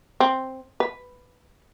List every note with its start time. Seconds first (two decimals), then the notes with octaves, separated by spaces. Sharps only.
0.20 C4
0.80 B4